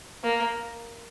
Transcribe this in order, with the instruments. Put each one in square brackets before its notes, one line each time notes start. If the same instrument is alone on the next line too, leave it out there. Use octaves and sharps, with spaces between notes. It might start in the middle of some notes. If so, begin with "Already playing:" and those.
[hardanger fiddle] A#3